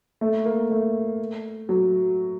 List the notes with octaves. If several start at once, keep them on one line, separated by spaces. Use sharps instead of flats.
A3
A#3
A3
F#3